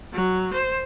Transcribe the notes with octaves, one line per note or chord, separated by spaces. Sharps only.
F#3
C5